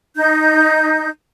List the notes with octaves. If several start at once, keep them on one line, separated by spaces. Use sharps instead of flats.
D#4 G6